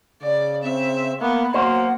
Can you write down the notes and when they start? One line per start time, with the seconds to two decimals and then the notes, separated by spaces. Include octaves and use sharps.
0.23 C#3 D5
0.63 C4 E5
1.21 A#3 B3 B5
1.54 F#3 A#3 C5 F#5